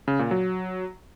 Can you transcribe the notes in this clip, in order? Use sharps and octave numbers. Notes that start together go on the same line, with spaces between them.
C#3
A#2
F#3